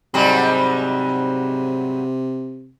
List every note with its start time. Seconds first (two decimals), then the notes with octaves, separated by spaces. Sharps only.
0.14 G#2 C3 F#3 G3